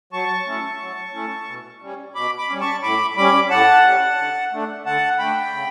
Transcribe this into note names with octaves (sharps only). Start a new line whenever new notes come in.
F#3 A5 C#6
A3 C#4 E4
F#3
A3 C#4 E4
B2
G3 C#4
B2 B5 D6
B5 D6
G3 C#4
A5 C#6
A2 B5 D6
G3 C#4 B5 D6
A2 F#5 A5
G3 C#4
D3
A3 D4
D3 F#5 A5
A3 D4 G5 B5
C#3